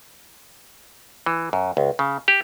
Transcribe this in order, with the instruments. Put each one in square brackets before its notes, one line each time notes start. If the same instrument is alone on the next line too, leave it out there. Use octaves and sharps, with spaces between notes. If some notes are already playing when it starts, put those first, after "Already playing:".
[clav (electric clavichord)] E3
F#2
C#2
C#3
G4